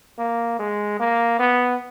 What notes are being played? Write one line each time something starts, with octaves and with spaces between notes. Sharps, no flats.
A#3
G#3
A#3
B3